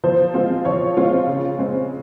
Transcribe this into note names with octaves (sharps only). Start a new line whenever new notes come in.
F3 C5
G#3 C4 F4
F3 C#5
G#3 C4 F4
C#3
G#3 C4